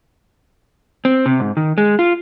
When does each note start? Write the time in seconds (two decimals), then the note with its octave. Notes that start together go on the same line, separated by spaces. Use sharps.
1.05 C4
1.26 C3
1.40 G#2
1.57 D#3
1.78 G#3
1.99 F4